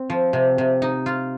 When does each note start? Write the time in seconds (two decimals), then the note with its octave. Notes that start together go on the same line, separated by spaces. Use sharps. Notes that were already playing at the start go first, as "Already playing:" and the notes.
Already playing: C4
0.10 F3
0.33 C3
0.58 C3
0.82 D#4
1.06 F4